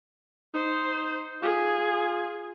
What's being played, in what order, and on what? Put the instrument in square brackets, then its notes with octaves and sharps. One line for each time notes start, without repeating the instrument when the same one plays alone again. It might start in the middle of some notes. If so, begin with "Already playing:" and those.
[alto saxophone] D#4 [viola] C5
[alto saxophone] F4 [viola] G#4